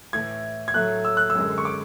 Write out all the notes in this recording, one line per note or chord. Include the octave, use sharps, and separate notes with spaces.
A2 E3 A3 G#6
G#6
A2 F#3 A3 F#6
E6
F#6
E6
F#2 D3 G#3
C#6
D6